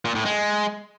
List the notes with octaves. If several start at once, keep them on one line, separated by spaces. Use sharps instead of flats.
A#2
A2
G#3